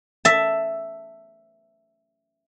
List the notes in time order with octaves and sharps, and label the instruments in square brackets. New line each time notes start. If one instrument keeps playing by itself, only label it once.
[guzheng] E5 A5